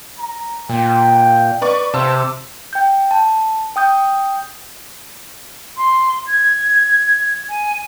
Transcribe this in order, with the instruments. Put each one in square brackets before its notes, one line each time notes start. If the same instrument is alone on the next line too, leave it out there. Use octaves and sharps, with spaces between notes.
[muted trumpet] A#5
[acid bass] A#2 [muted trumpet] G5
[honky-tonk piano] B4 D5 C#6
[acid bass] C3 [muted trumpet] C5 [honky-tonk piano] A5 E6
[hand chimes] G5 G6
A5
G5 D#6 G6
[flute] C6
G#6
G#5